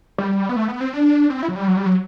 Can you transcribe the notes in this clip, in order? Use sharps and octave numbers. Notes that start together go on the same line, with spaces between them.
G3
B3
A3
B3
C4
D4
C4
E4
F#3
G3
F#3
G3
F#3